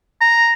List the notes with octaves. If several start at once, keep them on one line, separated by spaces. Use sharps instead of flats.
A#5